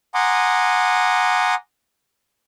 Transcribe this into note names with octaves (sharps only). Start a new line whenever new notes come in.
F#5 G#5 A#5 C6 D6 D#6